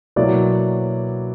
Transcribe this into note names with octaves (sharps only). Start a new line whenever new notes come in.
B2 F#3 A#3 E4 D5